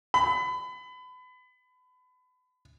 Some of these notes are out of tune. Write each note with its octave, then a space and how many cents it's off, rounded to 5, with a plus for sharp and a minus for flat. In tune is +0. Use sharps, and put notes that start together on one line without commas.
B5 +30